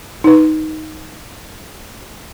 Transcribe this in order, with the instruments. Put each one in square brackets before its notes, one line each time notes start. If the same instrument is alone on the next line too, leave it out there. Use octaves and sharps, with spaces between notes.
[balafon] D#4 B4